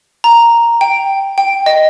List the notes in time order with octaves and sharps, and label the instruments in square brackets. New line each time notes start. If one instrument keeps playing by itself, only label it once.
[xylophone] A#5
G5
G5
D#5